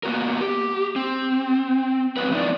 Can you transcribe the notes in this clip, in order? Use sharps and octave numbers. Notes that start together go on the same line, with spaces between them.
A#3 B3 F#4 A#4
G4
C4
F2 G#2 F#3 C4 B4
F3 B3 C#4 D#4 E4 D5